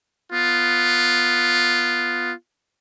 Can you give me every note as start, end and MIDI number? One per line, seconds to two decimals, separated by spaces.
0.32 2.33 59
0.32 2.33 65